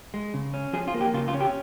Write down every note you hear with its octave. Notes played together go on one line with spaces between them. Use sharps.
G#3
C#3
C#4
F3 G#4
F4
A#3
G4
C#3 F4
F4
C#4
G4